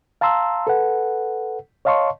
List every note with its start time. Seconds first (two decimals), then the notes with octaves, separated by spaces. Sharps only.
0.21 F5 A5 A#5 C6 E6
0.67 A4 B4 F#5
1.85 C#5 D#5 F5 A5 C6 C#6